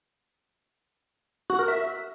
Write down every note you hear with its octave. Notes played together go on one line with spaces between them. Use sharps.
F#4
A#4
E5